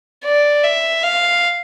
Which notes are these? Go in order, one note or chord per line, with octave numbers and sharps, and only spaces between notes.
D5
E5
F5